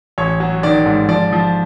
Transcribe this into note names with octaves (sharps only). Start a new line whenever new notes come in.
A1 C#5
F#3
D#3 D5
G#2
F3 D5
F3